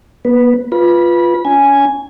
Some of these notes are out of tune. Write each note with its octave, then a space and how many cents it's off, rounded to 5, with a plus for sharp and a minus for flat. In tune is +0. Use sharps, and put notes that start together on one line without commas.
B3 -45 B4 +0
F4 +0 B4 +0 B5 -25
C#4 +30 G#5 +0